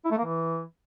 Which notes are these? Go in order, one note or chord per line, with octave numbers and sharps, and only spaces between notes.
E4
A3
A#3
E3